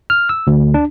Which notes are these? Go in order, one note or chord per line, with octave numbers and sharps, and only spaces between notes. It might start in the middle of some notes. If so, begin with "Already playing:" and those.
F6
E6
D2
D4